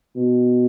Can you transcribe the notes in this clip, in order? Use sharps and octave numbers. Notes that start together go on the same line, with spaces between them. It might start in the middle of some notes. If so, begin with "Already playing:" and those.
B2